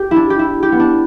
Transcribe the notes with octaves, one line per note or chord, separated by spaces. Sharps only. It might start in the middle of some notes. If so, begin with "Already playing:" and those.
Already playing: G4
D4 E4
G4
E4
G4
B3
D4